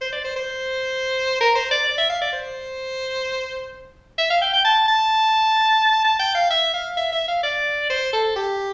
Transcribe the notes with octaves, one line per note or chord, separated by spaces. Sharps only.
C5
D5
C5
C5
A#4
C5
D5
D5
E5
F5
D5
C5
E5
F5
G5
G5
A5
A5
A5
G5
F5
E5
F5
E5
E5
F5
D5
C5
A4
G4